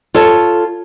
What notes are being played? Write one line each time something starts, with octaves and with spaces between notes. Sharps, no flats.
F4 A4 C#5 A5